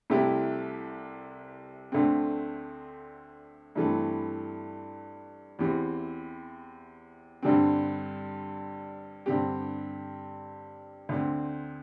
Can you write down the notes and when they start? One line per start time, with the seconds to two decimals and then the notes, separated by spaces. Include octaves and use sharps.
0.10 C2 C3 A3 E4 G4
1.92 D2 D3 A3 C4
3.75 G2 E3 A3 C4
5.59 E2 E3 C4 G4
7.43 G2 D3 G3 C4
9.26 G2 D3 C4 G4
11.09 D2 D3 C4